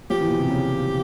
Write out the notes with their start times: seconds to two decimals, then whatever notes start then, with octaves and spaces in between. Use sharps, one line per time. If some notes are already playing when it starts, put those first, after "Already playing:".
0.10 F3 G4
0.21 A#2 E3
0.30 B2
0.39 C3
0.50 C#3